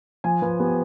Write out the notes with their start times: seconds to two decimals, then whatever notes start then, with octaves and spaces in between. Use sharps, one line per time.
0.24 F3 G#5
0.42 F3 B4
0.60 B3 G4